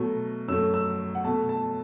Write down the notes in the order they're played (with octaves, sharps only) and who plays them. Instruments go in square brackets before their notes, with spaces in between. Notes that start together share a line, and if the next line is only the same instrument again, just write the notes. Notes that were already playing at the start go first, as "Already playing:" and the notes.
Already playing: [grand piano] B2 F#3 A3
F#2 F#3 A3 E6
E6
F#5
B2 A3 A5
A5